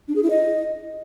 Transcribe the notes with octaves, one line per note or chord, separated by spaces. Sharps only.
D4
G#4
E4
D#5